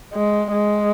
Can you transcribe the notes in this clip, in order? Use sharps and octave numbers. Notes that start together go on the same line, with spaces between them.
G#3
G#3